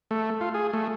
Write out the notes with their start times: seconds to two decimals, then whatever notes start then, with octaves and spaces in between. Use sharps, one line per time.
0.11 A3
0.41 F4
0.54 G#4
0.73 A3